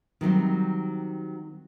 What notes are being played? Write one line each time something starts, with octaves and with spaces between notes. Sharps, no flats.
D#3 F#3 G3 C4